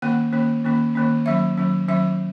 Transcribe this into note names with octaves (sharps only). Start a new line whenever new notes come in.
D#3 A#3 C#4 F#5
D#3 A#3 C#4
D#3 A#3 C#4
D#3 A#3 C#4
D#3 F#3 C#4 E5
D#3 F#3 C#4
D#3 F#3 C#4 E5